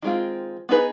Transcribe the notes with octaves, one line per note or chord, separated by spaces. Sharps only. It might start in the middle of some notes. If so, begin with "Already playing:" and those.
D#3 G#3 C4 F4
B3 D#4 G#4 B4